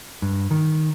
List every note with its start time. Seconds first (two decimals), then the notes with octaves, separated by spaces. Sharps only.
0.22 G2
0.51 D#3